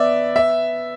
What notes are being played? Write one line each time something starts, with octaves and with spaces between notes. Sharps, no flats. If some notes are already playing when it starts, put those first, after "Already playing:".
Already playing: B3 D5 E5
E5